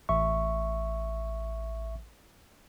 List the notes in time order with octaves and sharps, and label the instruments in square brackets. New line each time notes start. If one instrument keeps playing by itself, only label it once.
[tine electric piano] A1 E5 C#6